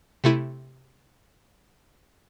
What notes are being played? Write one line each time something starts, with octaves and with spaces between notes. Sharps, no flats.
C3 A3 E4 D#7